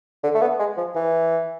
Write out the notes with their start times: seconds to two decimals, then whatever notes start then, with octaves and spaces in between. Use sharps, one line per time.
0.23 D3
0.34 A3
0.41 B3
0.59 G#3
0.77 F3
0.95 E3